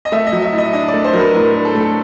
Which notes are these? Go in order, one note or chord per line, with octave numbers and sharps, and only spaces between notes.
D#5
A3 E5
D#5
F#3
E5
A2
D#5
D4 D#5
D5
A3
C5
F#3 A#4
B4
A2 A#4
A#4
D4
A4
A3
A4